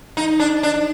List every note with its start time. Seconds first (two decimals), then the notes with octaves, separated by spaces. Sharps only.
0.17 D#4
0.40 D4
0.63 D4